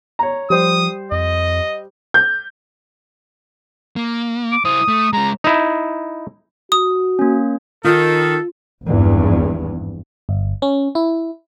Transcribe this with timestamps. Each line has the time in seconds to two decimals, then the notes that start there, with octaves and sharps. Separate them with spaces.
0.19 C#5 A#5
0.50 F3 G3 C5 D#6
1.12 F2 D#5
2.14 G6
3.96 A#3
4.51 D6
4.65 E4 C5 D#6
4.88 A3
5.13 G#3 C#4 A#5
5.44 D#4 E4
6.72 F#4 D#6
7.19 A#3 C#4
7.84 D#3 F4 A4
8.85 G#1 E2 G2
10.29 G1
10.62 C#4
10.95 E4